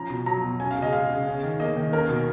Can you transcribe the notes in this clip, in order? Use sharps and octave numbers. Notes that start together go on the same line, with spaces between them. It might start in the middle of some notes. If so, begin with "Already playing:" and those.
Already playing: F3 C#4 A#5
B2
F#3 A#5
B2
C#4 G#5
F5
C#3
D#5
G#3 F5
C#3
C#4
D#3
A#3 D#5
D#3
C#4 A#4
B2